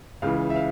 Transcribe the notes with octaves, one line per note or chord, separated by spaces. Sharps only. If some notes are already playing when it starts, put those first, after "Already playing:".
C#2 C#3 E3 F5
E5
F5